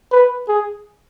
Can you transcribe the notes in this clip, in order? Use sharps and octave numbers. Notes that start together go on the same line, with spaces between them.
B4
G#4